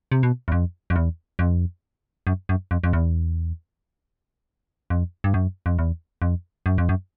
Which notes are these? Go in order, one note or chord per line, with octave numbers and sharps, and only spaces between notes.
C3
B2
E2
F2
F2
E2
F2
F#2
F#2
F2
F2
E2
F2
G2
F#2
F2
E2
F2
F#2
F2
F#2